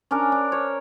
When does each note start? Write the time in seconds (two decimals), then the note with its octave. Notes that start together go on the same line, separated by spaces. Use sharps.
0.11 C#4 D4 A#4
0.32 D4
0.52 C#5